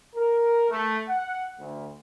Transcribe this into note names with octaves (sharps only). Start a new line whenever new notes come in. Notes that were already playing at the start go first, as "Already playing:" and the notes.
A#4
A3
F#5
D2